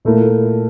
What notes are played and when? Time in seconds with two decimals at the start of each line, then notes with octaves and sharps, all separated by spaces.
0.05 A#2 A3 E4 A#4